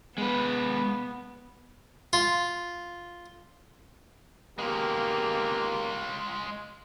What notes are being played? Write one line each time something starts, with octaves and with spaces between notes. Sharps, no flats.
G#3 B3 B4
F4
G#1 G#3 A#3 B3 F4 G4